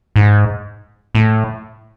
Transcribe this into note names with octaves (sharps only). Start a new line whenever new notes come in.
G#2
A2